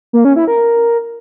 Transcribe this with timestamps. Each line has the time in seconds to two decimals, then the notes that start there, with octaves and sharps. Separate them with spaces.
0.13 A#3
0.25 C#4
0.36 E4
0.48 A#4